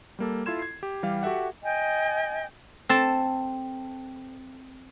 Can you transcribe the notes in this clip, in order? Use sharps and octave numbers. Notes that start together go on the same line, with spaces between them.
G3 A#3 A4
E4 F4 A4 C6 G#6 E7
G#6 C7
G4
E3 G3 G4 F5
F#4 G4 A4 E5 F#5
D#5 G5 G#5
C4 A4 A5